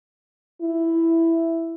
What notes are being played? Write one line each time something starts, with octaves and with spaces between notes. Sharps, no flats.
E4